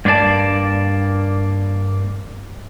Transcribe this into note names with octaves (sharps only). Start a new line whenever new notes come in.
G2 A#3 C#4 D5 A5